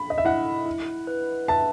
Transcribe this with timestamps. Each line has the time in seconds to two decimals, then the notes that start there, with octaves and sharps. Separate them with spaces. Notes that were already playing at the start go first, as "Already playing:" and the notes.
Already playing: B5
0.10 D#5
0.18 E5
0.25 E4 F#5
0.66 E4
1.07 B4
1.48 E5 A5